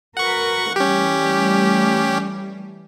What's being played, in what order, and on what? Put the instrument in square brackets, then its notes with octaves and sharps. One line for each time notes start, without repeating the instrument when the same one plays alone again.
[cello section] F#4 A#4 B4 [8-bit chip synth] F#5 C#6
[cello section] E3 G3 A3 [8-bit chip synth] C#4 G4